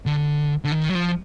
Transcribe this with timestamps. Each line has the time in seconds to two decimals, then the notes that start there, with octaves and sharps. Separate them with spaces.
0.06 D3
0.65 D3
0.72 D#3
0.89 F#3
0.95 F3